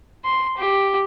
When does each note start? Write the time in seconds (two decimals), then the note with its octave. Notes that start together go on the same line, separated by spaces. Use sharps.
0.25 C6
0.58 G4